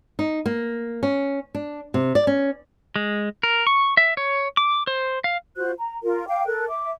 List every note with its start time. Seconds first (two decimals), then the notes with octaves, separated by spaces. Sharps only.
0.19 D#4
0.46 A#3
1.03 C#4
1.55 D4
1.94 C3
2.15 D5
2.27 C#4
2.96 G#3
3.43 A#4
3.67 C#6
3.97 E5
4.17 C#5
4.57 D6
4.87 C5
5.24 F5
5.56 F4 F#4 C5 F#6
5.78 A#5
6.02 F4 A#4
6.27 F5 G5 D6
6.46 A4 A#4 F#6
6.68 E5 D6